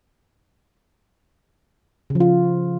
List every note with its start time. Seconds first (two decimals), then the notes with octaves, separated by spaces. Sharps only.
2.10 C#3
2.15 F3
2.20 F4